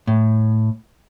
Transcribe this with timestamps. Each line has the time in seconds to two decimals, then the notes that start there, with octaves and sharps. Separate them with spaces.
0.07 A2